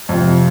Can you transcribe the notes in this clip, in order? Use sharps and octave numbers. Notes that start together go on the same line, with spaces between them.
F2 C3 F3